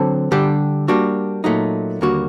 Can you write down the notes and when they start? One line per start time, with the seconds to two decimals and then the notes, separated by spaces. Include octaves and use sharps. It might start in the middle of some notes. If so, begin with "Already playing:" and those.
Already playing: D3 F#3 C4 A4
0.32 D3 G3 D4 G4
0.88 G3 A#3 D4 F#4
1.44 A#2 F#3 A3 D#4
2.01 D#2 D3 G3 A#3 F#4